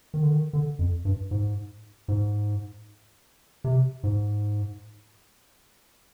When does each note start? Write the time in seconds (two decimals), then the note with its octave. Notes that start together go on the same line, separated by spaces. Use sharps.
0.14 D#3
0.22 D3
0.31 D#3
0.53 D3
0.79 F2
1.05 G2
1.31 G#2
2.08 G#2
3.64 C3
4.03 G#2